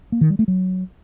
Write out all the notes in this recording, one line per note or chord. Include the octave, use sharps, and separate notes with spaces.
A#3
D#3
G3
A3
F#3